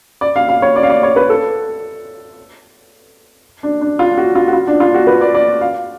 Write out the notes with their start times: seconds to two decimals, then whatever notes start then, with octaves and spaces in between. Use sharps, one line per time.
0.21 D5
0.36 F5
0.49 F5
0.62 C#5
0.76 D5
0.83 F5
0.90 D5
1.03 C#5
1.16 B4
1.30 A4
3.63 D4
3.81 D4
3.99 F4
4.18 F#4
4.35 F4
4.48 F#4
4.53 F4
4.67 D4
4.80 F4
4.94 F#4
5.07 B4
5.21 D5
5.34 D5
5.61 F5